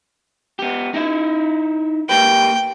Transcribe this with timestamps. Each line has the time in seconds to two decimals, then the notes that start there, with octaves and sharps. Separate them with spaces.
0.59 B3 G4
0.94 D#4 E4 E5
2.09 A#3 G4 B4 G5